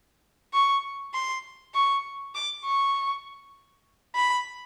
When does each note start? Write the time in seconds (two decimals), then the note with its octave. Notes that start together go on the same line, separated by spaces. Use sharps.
0.54 C#6
1.14 C6
1.74 C#6
2.35 D6
2.64 C#6
4.15 B5